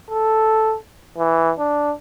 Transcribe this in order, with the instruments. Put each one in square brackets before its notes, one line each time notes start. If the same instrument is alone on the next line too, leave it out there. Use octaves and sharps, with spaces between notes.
[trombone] A4
E3
D4